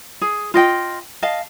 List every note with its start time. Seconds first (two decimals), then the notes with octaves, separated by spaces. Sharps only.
0.21 G#4
0.54 F4 D#5 G5
1.22 D#5 F5 A5